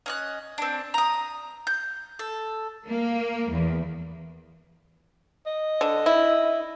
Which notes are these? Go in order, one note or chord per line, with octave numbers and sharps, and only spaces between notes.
C#4 D#5 F#6
C4 D4
A#5 D#6
G6
A4
A#3
E2
D#5
D3
E4